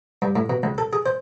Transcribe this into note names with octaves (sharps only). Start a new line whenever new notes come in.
G2
A2
B2
C#2
A4
G#4
C5